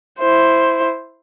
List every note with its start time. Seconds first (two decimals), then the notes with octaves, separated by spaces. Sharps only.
0.19 E4 C5